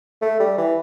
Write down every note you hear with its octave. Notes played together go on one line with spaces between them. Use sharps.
A3
G3
E3